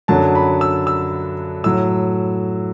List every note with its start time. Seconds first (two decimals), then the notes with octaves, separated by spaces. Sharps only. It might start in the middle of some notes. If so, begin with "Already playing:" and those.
0.08 F#2 D3 F#3 A5
0.35 B5
0.61 E6
0.87 E6
1.64 A2 F#3 E6